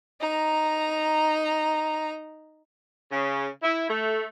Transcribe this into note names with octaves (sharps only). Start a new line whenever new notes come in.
D#4 A#5
C#3
E4
A3